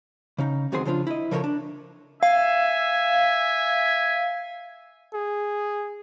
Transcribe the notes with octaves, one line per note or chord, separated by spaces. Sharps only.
C#3 C#4 D#4
C#2 D#3 F#3 C4 G#4 C6
C#3 F3 D4 D#4 F4
E4 D#5
C#3 F3 A4 A#4 C5 C#5
D4
E5 F5 G#5
G#4